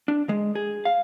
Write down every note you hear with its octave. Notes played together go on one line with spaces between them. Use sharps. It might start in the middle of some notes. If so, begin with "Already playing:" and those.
D4
G#3
G#4
F5